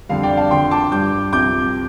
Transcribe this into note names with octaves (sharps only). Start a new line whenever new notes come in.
F2 D3 G3 F5
D5 G5
F5 A5
F2 D3 F3 G5 C6
A5 D6
G2 G3 D6 G6
C2 C3 F3 D6 G6